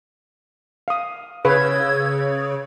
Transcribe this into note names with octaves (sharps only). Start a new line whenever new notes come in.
F5 D#6
C#3 B4 E6 G#6